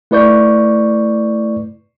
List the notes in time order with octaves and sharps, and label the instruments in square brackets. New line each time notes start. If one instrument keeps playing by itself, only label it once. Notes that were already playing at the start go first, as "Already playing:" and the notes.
[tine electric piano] A3 E4 B4 D5 C#6 G6